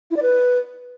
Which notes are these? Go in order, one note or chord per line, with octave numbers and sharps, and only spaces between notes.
E4
D5
B4